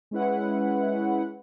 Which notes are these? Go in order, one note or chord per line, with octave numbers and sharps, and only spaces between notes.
G#3 C#4 E4 B4 F#5